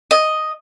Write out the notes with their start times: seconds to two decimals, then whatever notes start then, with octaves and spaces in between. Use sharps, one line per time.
0.11 D#5